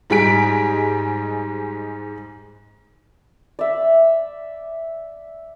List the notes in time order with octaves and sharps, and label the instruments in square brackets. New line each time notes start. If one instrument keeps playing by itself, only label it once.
[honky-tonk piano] G#2 G3 G#3 G#5 B6 D7
[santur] D5 E5